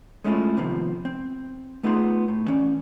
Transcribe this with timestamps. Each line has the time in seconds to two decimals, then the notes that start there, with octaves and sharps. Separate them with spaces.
0.24 G#3 A3 C#4 E4 F4 A4
0.57 C3 D#3 F3 B3 C4
1.05 C4
1.83 A3 B3 D#4 F4 G#4 C6
2.28 A2
2.47 E3 C#4 D5